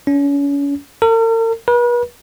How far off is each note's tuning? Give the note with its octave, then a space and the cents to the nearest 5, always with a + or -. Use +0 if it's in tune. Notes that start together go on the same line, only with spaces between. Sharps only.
C#4 +35
A#4 -45
B4 -40